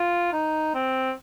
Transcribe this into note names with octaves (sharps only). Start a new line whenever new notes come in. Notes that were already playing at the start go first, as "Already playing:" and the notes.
Already playing: F4
D#4
C4